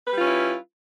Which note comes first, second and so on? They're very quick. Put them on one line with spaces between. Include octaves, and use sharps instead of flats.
B4 G3 F4 C#4 E4